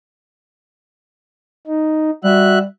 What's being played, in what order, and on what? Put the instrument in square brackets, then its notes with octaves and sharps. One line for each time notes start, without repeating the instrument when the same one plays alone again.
[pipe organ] D#4
[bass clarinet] G3 [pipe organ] F#4 E5 F#6